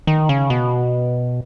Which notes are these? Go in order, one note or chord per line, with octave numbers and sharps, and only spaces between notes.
D#3
C#3
B2